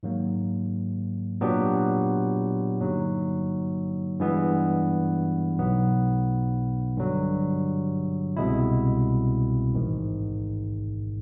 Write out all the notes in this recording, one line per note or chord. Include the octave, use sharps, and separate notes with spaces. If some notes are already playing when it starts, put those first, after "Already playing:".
G#2 D#3 F#3 A#3
A#2 F#3 B3 D4 G4
G2 D3 F#3 A#3 D#4
G2 E3 G#3 B3
B1 B2 F#3 B3 D#4
G2 D3 F#3
C2 B2 G#3 C4 E4
A1 G#2 D#3